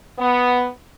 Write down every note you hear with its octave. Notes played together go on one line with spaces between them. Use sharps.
B3